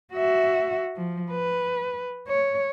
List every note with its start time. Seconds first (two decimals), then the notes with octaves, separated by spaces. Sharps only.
0.14 F#4 E5
0.96 F3
1.31 B4
2.28 C#5